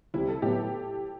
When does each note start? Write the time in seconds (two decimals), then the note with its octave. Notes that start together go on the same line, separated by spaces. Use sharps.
0.14 C2 C3 G3 E4
0.28 A4
0.42 A2 F#3 B3 G4